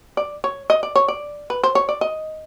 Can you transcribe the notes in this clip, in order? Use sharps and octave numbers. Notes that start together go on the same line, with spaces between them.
D5
C#5
D#5
D5
C#5
D5
B4
C5
C#5
D5
D#5